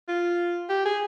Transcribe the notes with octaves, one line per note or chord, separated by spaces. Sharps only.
F4
G4
G#4